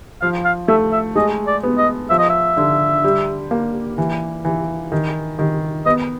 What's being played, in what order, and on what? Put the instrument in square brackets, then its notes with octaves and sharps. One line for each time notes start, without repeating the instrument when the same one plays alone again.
[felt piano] F3 [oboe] F5
[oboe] F5
[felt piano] A3 [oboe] E5
[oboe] E5
[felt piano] G#3 [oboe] D#5
[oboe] D5
[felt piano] B3
[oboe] D#5
[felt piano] F3 [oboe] E5
[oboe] D#5
E5
[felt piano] D3
G3
A#3
E3
E3
D#3
D#3
[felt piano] B3 [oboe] D#5